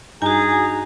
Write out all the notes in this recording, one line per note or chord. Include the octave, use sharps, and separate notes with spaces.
G2 D#4 F#4 G#4 G#5 A#5 G6